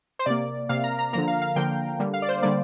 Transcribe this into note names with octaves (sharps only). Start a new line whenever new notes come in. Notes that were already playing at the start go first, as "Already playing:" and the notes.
C5
C3 A#3 D5
C3 A#3 F5
A#5
A#5
D3 F3 A#3 A#5
F5
F5
D3 F3 A#3 G5
D3 G3 A#3
F5
D5
C5
D3 G3 A#3 D5